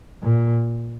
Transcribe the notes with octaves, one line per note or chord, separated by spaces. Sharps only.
A#2